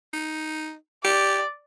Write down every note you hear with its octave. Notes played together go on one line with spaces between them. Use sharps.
D#4
G4 D5